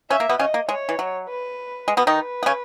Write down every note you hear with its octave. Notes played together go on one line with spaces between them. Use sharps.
C#3 C#4 E5
A#3
B2 B3
C#3 C#4 D#5
A#3
G#3 C#5
E3
F#3
B4
G#3
B2 B3
D#3 D#4
B4
B3
C#3 C#4